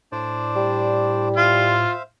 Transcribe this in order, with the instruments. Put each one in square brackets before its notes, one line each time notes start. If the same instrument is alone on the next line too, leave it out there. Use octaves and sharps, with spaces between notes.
[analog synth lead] A2 [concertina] D4 C5 D5
[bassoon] G3
[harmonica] F4 [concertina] C5 E5 F5